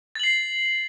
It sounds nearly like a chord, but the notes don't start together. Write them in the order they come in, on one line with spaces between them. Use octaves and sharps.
A6 F#7 C7